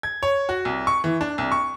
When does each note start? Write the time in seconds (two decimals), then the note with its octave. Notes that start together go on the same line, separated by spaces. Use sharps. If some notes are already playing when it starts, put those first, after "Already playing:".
0.03 G#6
0.23 C#5
0.49 F#4
0.65 C2
0.87 C#6
1.04 E3
1.21 D4
1.38 C2
1.52 C#6